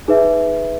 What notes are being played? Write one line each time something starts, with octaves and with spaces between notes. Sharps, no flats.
D#4 G#4 B4 E5